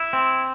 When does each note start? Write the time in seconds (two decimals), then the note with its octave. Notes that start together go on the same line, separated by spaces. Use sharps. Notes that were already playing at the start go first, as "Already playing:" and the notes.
Already playing: E4
0.13 C4